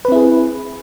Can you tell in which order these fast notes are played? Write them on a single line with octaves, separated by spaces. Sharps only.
B4 C4 E4 G#4